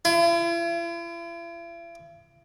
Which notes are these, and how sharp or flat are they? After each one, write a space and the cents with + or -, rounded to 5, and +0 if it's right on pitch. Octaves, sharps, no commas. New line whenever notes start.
E4 +45